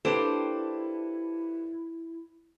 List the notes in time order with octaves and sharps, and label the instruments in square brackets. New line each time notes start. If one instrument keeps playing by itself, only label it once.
[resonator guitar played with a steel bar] A#3 D4 G4 [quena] E4 [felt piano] A4 B4 E7 [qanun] C5